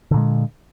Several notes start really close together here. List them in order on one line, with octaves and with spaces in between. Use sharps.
D3 A#2 G#3